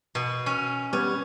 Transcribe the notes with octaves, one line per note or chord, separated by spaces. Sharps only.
B2
C#4
G3 B3 C#4 G#6